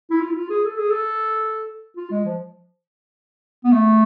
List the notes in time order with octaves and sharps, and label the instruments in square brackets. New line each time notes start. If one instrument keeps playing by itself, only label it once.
[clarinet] E4
F4
E4
F4
G#4
A4
G#4
A4
F4
G#3
F3
B3
A3